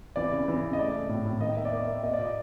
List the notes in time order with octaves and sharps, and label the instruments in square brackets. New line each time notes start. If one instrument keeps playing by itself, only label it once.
[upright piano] E3 D5
C#3
E3
C#3
D#5
A3 D5
A3
A2
A2
D#3 D#5
A#3 E5
D5
A#3 D#5
A#3 E5
A#3 D#5
A#2 D5
D#5